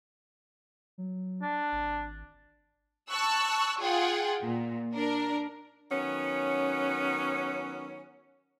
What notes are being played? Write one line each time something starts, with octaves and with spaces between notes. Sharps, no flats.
F#3
D4
G#1
A5 C#6 E6 F#6
F4 G#4 F#5 G5
A#2
D4 A#4
D#3 F#3 B3 C#4